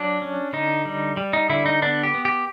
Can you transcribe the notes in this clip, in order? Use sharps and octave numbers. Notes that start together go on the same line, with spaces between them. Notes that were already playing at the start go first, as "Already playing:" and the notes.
Already playing: F#3 D4
C#4
D3 D#4
G3
G3
D#4
D3 E4
D#4
B3 D4
G4
B3
G4